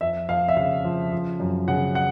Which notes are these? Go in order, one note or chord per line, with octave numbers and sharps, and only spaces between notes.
F2 E5
F2 F5
E5
C#3 F5
F3
F3
F#2
C#3 F#5
F#5